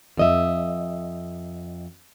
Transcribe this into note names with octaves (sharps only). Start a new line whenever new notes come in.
F2 D#5 E5